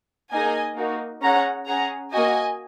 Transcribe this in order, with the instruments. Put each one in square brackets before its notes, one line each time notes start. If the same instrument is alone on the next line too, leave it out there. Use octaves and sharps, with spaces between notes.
[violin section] A#3 D#4 G#4 D#5 G#5
A#3 D#4 F#4
C#4 G#4 F#5 A#5
C#4 G#4 F#5 A#5
A#3 F#4 D#5 G#5